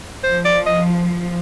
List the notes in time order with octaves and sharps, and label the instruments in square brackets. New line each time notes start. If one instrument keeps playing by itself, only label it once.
[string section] F3 [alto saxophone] C5
[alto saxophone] D5
D#5